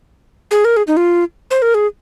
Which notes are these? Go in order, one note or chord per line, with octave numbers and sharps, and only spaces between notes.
G#4
A#4
G#4
D#4
F4
C5
A#4
G#4